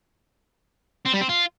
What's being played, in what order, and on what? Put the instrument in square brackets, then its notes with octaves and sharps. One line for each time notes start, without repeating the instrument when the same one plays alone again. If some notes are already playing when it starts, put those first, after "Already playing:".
[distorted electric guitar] C4
G3
C4
F4